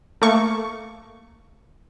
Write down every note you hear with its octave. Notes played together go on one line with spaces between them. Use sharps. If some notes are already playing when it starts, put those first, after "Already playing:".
A3 A#3 C#6